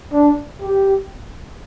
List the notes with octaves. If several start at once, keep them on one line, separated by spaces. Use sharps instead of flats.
D4
G4